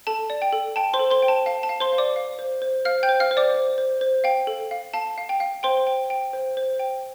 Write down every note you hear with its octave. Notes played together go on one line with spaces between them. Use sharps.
A4 A5
D5
G5
A4
G5 A5
C5 C6
A4
C5 C6
G5
A5
F5 A5
A5
F5
C5 C6
F5
D5 D6
F5
C5
C5
C5 F5 F6
G5 G6
C5
F5 F6
C5
D5 D6
C5
C5
C5
F5 G5
A4
F5
F5 A5
F5
G5
F5
C5 G5 C6
G5
G5
C5
C5
G5